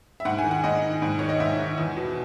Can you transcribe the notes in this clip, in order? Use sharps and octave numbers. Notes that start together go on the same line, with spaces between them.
E5
G#2 F#5
G#5
D#3
F#5
G#2 D#5
D#3
G#2
D#3 C#5
D#5
G#2 E5
D#3
E2
B2